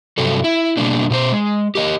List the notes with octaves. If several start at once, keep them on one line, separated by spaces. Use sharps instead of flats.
G2 C3 F#3 A4
E4
B2 G3 A#3 D4
B2 A#4 C5
G#3
G4 A#4 D#5